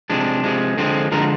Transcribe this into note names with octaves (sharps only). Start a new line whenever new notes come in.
C3 F3 G#3 D4
C3 F3 G#3
D3 F3 G#3 C4
D3 F3 G#3 A#4